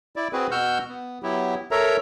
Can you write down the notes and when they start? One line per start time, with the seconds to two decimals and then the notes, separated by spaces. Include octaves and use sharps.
0.16 E4 D5
0.33 C4 F#4 G#4 B4
0.51 B2 F#4 F#5 E6 F6 G6
0.89 B3
1.23 F#3 B3 E4 G4
1.71 A4 A#4 C#5 E5 A#5